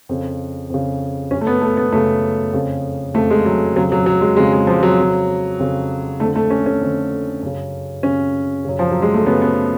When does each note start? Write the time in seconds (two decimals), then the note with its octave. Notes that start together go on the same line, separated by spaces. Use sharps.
0.09 F2 C#3
0.70 F2 C#3
1.31 F#2 C#4
1.37 C#3 A3
1.47 B3
1.61 A3
1.77 B3
1.92 F#2 C#3 A3
2.53 F2 C#3
3.14 F2 C#3 A3
3.31 G#3
3.45 F#3
3.75 F2 C#3 F#3
3.92 F#3
4.06 F#3
4.21 G#3
4.36 F2 C#3 G#3
4.53 G#3
4.67 F3
4.83 F#3
4.99 F2 C#3
5.59 F2 C#3
6.20 F2 D3 A3
6.35 A3
6.50 C#4
6.66 C#4
6.81 F2 D3
7.43 F#2 C#3
8.03 F#2 C#3 C#4
8.65 F#2 C#3
8.79 F3
8.92 F#3
9.02 G#3
9.14 A3
9.25 F#2 C#3 B3
9.42 B3